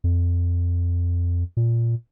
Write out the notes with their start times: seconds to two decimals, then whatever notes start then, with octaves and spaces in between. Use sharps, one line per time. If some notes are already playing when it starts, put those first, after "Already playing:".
0.04 F2
1.57 A#2